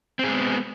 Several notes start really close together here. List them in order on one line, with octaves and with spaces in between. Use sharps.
C4 G#4 G#3 B3